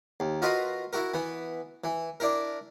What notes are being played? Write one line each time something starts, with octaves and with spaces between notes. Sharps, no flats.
D#2
F4 F#4 A#4 B4 D#5
E4 F#4 A#4
E3 B3
E3
D4 E4 A#4